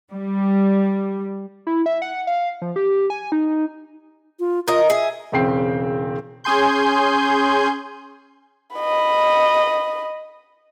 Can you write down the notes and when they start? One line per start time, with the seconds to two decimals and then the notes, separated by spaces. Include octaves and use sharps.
0.12 G3
1.67 E4
1.86 E5
2.02 F#5
2.27 F5
2.62 F3
2.76 G4
3.10 G#5
3.32 D#4
4.40 F4
4.68 F4 A#4 D#5
4.90 G#4 E5
5.32 E1 E2 C#3 C4 G5 C7
6.44 C#4 G#4 G#5 C6 G6
8.76 D#5 B5